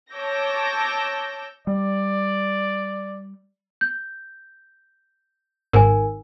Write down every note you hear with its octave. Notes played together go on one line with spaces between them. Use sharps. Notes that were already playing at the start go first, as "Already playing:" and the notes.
C#5 A5 D6 E6 G6 A#6
G3 D5
G6
G#1 G#2 A#4 G#5